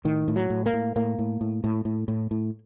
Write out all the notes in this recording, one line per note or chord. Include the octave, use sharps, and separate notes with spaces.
A2 D#3
A2
F#3
A2
A#3
A2
A2 A#3
A2
A2
A2
A2
A2
A2